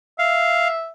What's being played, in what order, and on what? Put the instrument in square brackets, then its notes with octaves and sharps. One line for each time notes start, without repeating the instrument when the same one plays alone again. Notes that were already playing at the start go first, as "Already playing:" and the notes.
[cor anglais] E5 [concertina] F5